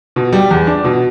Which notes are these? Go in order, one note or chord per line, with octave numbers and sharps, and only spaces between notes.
B2
G3
E2
D4
B2